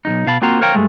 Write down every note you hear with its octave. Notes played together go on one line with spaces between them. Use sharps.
B1 F2 D#4
B2 F5 A5 B5
A#3 C4 F4 F#4 C5 A#5
A#4 C5 C#5 F5 G5 A#5
G2 G#3 A3